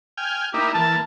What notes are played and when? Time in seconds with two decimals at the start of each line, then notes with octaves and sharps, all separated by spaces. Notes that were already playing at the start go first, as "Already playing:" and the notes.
0.17 G5 G#5 F6
0.54 A#3 D#4 E4 G4
0.75 E3 A#3 A5